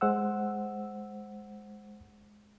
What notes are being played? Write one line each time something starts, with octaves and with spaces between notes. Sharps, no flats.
G#3 C5 F#5 E6